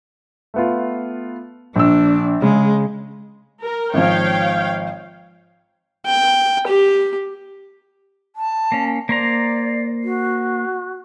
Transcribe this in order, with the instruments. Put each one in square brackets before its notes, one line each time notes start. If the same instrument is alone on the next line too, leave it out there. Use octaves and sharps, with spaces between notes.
[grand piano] A3 B3 F4
[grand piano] A#1 E6 [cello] D4
[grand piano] C#3 [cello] G#3
[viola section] A#4
[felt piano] G#1 F3 [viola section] C#5 F5 G5
[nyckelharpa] G5
G4
[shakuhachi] A5
[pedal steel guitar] A#3 C#4
[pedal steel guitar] A#3 C5 A#5 [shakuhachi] D5
[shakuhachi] F#4